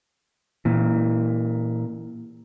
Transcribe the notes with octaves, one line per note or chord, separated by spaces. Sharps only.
A#2 E3